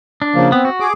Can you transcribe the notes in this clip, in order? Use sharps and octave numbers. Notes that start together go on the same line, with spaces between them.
D4
C#3 F3 A#3
B3 C4
F#4
G#4 D6